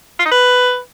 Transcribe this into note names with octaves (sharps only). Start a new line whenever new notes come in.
F4
D#4
B4